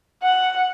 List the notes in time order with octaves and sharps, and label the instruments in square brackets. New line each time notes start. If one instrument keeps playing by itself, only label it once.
[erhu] F#5